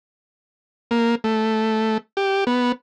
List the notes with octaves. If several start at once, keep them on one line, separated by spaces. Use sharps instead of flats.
A#3
A3
G4
B3